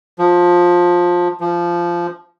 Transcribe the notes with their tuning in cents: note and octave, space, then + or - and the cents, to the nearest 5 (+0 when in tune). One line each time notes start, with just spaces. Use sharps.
F3 +15
F3 -15